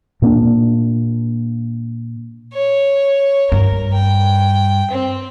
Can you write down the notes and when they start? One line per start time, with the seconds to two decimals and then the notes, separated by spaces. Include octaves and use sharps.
0.22 A#2 A#3 C4 D4
2.54 C#5
3.52 G2 A#4
3.94 G5
4.91 C4